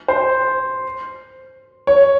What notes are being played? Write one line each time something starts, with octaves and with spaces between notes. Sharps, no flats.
C5
C#5